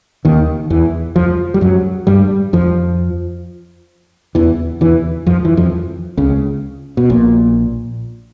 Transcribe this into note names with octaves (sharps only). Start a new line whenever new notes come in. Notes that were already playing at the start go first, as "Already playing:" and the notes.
D#2 D#3
E2 E3
F2 F3
G3
F#2 F#3
G2 G3
F2 F3
E2 E3
E2 E3
F2 F3
E3
F2 F3
C#2 C#3
B2
A#1 A#2